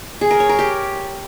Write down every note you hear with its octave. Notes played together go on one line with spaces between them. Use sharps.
G#4
A#4
C#5
A#4
G4